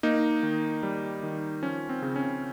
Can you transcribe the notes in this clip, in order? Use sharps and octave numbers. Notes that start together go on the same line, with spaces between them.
A#3 D#4
D#3
G3
D#3
F3 C#4
C4
C#3
C#4